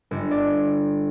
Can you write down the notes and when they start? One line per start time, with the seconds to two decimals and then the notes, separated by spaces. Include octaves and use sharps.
0.11 G1
0.31 D5